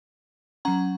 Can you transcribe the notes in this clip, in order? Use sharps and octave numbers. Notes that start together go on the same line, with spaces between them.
F#3 C#4 F#5 A#5